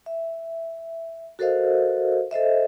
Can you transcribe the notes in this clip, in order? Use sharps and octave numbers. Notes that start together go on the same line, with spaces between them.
E5
F#4 A4 A#4 C5 D#5 F5
A4 C5 D#5 E5